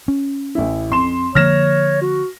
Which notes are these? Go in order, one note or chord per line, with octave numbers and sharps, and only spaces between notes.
C#4
A1 E4
F2 C6 E7
D3 F3 A#3 C#5 F6 A#6 E7
F#4